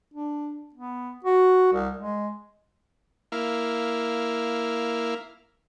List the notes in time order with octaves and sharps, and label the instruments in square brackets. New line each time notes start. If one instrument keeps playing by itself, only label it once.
[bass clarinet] D4
B3
F#4
C2
G#3
[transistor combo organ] A#3 E4 F5